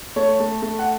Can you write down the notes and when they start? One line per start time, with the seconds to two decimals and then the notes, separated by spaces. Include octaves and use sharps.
0.16 A3 C#5
0.40 A3
0.62 A3
0.79 F#5